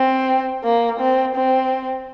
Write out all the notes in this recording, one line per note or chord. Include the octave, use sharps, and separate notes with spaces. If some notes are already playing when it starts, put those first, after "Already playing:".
Already playing: C4
A#3
C4
C4